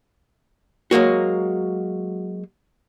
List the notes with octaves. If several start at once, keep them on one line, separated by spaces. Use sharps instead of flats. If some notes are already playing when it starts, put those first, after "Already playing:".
F#3 G#3 A#3 F#4